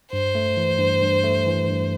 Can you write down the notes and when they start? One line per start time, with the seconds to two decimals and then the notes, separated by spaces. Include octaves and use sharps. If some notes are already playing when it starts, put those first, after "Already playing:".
0.12 G2 C5
0.35 A3
0.57 E3
0.79 G2
1.02 G2
1.24 A3
1.46 E3
1.68 G2